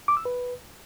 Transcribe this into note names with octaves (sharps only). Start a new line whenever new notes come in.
D6
E6
B4